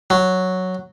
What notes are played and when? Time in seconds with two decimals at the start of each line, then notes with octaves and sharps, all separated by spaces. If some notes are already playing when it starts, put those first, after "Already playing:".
0.10 F#3